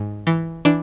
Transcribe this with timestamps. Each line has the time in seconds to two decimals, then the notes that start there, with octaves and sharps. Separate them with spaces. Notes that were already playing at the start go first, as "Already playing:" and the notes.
Already playing: G#2
0.27 E3
0.65 E3 D4